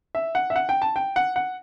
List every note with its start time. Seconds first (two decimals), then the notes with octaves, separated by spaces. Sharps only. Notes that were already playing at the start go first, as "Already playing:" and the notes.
0.15 E5
0.35 F#5
0.50 E5
0.56 F#5
0.69 G5
0.82 A5
0.96 G5
1.16 F#5
1.36 F#5